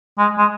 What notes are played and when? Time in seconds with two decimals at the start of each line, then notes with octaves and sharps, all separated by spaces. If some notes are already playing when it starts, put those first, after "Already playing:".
0.18 G#3
0.37 G#3